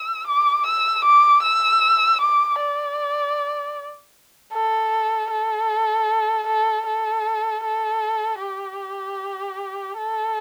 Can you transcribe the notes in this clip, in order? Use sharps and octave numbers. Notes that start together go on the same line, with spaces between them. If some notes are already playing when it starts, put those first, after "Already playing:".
Already playing: E6
D6
E6
D6
E6
D6
D5
A4
A4
A4
A4
A4
G4
A4